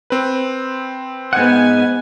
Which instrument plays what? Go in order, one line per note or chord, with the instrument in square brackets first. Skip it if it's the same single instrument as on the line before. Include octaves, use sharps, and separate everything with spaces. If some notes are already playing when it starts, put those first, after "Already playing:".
[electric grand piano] C4 B4
[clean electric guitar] G#2 F#5 [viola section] B3 G#5